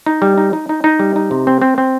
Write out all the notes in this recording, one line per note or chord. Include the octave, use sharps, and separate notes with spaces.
D#4
G3
D#4
D#4
D#4
D#4
G3
D#4
C3
C4
C4
C4